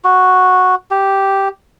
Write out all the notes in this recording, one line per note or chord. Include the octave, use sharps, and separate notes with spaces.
F#4
G4